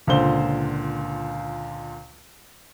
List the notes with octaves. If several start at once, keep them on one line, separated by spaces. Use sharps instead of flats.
C#2 A#2 D3 F4 C5 G7